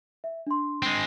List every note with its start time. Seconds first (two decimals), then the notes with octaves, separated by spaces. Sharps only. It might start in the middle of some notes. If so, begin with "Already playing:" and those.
0.24 E5
0.47 D4 C6
0.82 G#3 C4